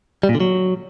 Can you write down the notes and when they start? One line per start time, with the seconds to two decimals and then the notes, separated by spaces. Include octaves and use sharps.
0.23 G3
0.29 A#2
0.35 D3
0.40 F#3